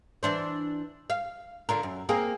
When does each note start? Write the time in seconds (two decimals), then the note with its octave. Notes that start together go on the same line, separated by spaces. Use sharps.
0.23 E3 D4 C5
1.10 F5
1.69 D3 F4 A#4
1.83 F#2
2.09 A#3 C4 G#4